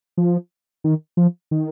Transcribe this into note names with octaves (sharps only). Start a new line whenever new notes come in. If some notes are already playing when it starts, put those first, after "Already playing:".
F3
D#3
F3
D#3